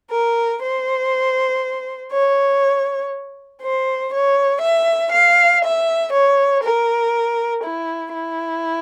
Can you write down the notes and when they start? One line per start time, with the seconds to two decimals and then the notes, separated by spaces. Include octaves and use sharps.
0.12 A#4
0.63 C5
2.12 C#5
3.63 C5
4.13 C#5
4.62 E5
5.13 F5
5.63 E5
6.13 C#5
6.63 A#4
7.63 E4
8.13 E4